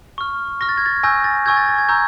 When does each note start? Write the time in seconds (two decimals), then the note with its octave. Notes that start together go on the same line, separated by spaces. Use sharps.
0.18 C#6 F6
0.61 C#6 F6 A#6
0.69 A6
0.78 G#6
0.86 A6
1.03 G#5 C#6 E6 G6 A#6
1.24 A6
1.46 G#5 C#6 E6 G6 G#6
1.57 A6
1.68 A6
1.78 G#6
1.89 A#5 C#6 E6 G6